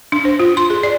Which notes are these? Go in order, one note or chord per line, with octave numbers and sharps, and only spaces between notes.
D4
C5
F4
C6
G#4
D5